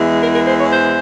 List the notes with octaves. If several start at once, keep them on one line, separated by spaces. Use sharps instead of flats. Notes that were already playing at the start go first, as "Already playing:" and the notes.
Already playing: E2 E3 G#3
A#4
A#4
C5
C#5
C5